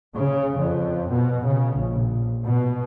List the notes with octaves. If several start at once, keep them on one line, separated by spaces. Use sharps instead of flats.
C#3
F2
B2
C#3
A#1
B2